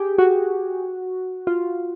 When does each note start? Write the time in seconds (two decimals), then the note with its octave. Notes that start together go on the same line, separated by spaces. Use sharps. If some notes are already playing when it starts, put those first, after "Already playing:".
Already playing: G4 G#4
0.18 F#4
1.47 F4